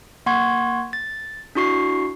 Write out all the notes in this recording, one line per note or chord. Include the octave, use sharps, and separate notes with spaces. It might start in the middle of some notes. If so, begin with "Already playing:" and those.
A#3 F#5 C6 C#6 G#6
A6
D4 E4 F#4 C#6 C7